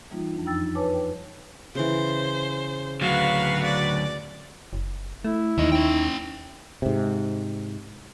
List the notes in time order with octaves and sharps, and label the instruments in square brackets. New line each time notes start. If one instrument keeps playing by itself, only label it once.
[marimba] E3 G3 A#3 D#4 F4
F2 F3 D4
F#2 D#4 G5 E6 A6
B4 C#5 G#5 A5 D6
G5
[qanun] C#3 E3 [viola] C5
[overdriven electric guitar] D2 F#3 [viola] F#4 B4 [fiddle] F5
[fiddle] D5
[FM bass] F#1
[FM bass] A3 [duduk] E4
[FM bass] D#2 [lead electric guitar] E3 D#5 [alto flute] D#4
[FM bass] D#2 [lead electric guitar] C#4 G5
[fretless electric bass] G#2 C3